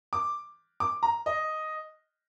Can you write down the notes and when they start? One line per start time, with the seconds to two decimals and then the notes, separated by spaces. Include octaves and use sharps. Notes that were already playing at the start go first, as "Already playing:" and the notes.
0.13 D6
0.80 D6
1.03 A#5
1.26 D#5